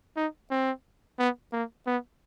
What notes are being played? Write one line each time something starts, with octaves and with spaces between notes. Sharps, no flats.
D#4
C4
B3
A#3
B3